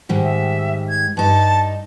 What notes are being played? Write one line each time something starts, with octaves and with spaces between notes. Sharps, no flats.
G#2 D#3 G3
E5
G#6
G2 D#4 A5